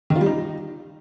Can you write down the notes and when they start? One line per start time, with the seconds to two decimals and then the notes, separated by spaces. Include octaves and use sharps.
0.10 D#3
0.16 F4
0.21 G3
0.26 D#4